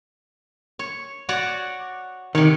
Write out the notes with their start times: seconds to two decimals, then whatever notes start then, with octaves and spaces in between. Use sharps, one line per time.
0.79 C#5
1.29 F#4 C#5 D5
2.35 C3 D#3 C#5